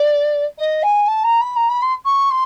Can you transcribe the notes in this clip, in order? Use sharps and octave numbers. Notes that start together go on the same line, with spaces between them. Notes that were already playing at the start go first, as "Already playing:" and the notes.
Already playing: D5
D#5
G#5
A5
A#5
B5
A#5
B5
C6
C#6
C6